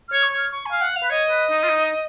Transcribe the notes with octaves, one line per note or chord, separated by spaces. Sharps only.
C#5 F6
C#6
C#5 F6
C#6
G#5
F5
F#5
F5
B4
C#5 D#5
B4
D#4
F4
D#4